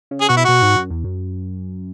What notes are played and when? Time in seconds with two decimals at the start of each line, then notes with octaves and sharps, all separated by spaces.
0.11 C#3
0.21 G#4
0.29 B2 F#4
0.37 E4
0.45 B2 F#4
0.62 G#2
0.76 F#2
0.90 E2
1.04 F#2